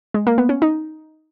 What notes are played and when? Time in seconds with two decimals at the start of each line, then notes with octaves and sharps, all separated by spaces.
0.14 G#3
0.27 A#3
0.38 B3
0.49 C#4
0.62 D#4